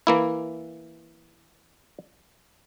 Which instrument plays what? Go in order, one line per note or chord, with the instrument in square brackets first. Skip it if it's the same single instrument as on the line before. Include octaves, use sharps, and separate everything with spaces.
[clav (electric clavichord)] E3 A#3 E4